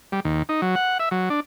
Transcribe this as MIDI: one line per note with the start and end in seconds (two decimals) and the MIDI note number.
0.12 0.20 55
0.25 0.43 39
0.49 0.61 63
0.62 0.75 54
0.76 0.98 78
1.00 1.09 76
1.11 1.29 54
1.30 1.40 62